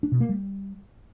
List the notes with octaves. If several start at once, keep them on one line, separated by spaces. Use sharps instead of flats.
D4
B2
A#3
G3